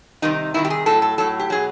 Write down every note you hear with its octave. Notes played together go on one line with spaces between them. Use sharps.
C3 D#3 G3 D#4
C3 D#3 G3 E4
G4
G#4
A2 F#3 A4
A4
A2 F#3 A4
G4
B2 F#3 G#4